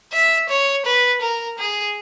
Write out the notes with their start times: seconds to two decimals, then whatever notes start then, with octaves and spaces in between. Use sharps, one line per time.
0.12 E5
0.49 C#5
0.86 B4
1.21 A#4
1.58 G#4